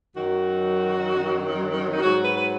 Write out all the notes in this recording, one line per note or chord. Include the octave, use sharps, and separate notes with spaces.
F#2 D#3 F#3 F#4
D#4
G#2 F#3 F#4
B4
B4